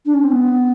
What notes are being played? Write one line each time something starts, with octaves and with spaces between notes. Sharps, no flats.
D4
C#4
C4
B3